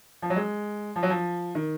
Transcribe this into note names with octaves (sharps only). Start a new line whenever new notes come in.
F3
F#3
G#3
F3
F#3
F3
D#3